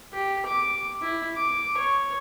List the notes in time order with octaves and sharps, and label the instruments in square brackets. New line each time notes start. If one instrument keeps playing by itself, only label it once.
[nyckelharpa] G4
D6
E4
D6
C#5